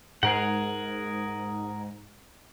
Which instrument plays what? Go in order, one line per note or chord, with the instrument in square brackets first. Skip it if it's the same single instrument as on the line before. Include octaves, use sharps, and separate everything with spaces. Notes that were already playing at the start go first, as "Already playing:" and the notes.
[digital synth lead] G#2 [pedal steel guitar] G#4 A#4 F#5